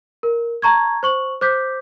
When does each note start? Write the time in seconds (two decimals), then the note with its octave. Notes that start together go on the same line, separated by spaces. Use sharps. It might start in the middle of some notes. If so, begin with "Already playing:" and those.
0.23 A#4
0.62 A5 A#5 C#6 G#6
1.03 C5 C#6 F#7
1.41 C5 D6 G6 B6